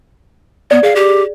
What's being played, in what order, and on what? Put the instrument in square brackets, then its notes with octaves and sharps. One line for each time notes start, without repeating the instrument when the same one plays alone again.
[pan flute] B3 [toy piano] D5
[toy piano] G#4 [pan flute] F5
[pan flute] G4